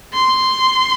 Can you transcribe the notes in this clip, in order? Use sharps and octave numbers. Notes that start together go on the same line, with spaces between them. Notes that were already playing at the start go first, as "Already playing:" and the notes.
C6